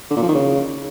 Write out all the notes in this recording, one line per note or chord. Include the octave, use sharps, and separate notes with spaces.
D3
A#2
F3
D#3
C#3